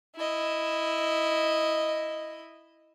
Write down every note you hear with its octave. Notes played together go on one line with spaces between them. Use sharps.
E4 D#5